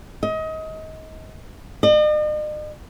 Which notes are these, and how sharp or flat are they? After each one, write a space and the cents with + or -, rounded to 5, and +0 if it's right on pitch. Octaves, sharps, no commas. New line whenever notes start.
D#5 +25
D#5 -45